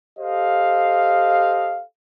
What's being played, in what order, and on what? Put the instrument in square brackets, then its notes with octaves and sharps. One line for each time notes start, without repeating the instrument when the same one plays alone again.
[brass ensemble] G4 A4 C5 D#5 F5